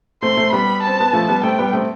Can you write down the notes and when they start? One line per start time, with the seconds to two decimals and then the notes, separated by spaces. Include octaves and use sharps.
0.22 A3 C4 C6
0.37 A3 C4
0.53 G3 B3 B5
0.83 C4 A5
1.00 B3
1.13 F3 A3 A5
1.29 G3 B3
1.43 A3 C4 G5
1.59 G3 B3
1.73 A3 C4